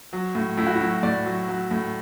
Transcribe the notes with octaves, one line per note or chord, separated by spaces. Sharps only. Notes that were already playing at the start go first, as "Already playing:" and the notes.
F#3
A2
A2 E4
F#4
E4
F#3
A2 D5
F#3
F#3
A2